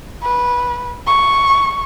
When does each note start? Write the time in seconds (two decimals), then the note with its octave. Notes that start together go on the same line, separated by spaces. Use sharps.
0.23 B4
1.07 C#6